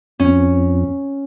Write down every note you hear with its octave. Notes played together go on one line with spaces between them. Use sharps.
F2 C#4